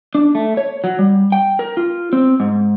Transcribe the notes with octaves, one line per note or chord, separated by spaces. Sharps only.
D4
A3
C#5
F#3
G3
G5
A#4
F4
C4
G#2